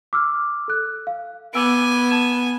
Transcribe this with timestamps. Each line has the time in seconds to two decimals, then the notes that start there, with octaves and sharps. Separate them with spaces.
0.13 D6 E6 F6
0.68 A4 F#6
1.07 F5
1.54 B3 G#5 D6 E6 D7
2.11 A5 G#6 E7